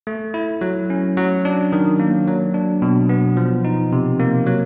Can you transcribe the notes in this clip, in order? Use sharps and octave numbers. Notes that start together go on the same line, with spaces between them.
A3
E4
F#3
C#4
F#3
D4
D#3
A#3
F#3
D4
B2
B3
F3
D#4
C3
A#3
F#3